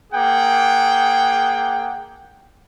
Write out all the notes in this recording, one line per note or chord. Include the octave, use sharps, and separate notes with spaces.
A#3 G#4 F#5 G5